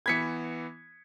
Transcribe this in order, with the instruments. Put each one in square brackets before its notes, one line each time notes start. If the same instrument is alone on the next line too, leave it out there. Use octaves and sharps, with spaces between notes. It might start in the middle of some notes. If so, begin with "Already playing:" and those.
[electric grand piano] E3 B3 B5 [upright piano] G#6 B6 C#7